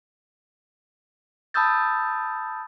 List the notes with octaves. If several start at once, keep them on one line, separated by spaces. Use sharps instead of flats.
A5 B5 D#6 E6 G6 A6